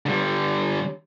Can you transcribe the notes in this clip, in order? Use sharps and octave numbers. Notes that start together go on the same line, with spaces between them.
D3 G3